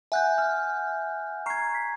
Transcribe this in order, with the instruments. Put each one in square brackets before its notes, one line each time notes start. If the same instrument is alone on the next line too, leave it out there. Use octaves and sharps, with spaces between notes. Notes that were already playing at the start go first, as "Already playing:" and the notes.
[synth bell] E5 F#5 [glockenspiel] G#5 F#6 G6
[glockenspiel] F6
[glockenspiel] A#5 G#6 [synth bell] C#6 F6 C7
[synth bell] B6